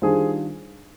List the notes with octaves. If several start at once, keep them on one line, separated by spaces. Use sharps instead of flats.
D#3 G3 D4 F4 G#4 C5